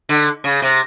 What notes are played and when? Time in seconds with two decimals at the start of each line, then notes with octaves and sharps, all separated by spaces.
0.09 D3
0.44 C#3
0.62 C3